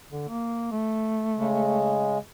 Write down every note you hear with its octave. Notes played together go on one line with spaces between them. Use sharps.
D3
A#3
A3
C#3 G#3